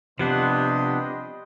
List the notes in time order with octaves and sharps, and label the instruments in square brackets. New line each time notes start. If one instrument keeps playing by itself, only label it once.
[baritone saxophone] C3 [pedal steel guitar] F3 B3 D4 [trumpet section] G3 C5 D#5 [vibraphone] G4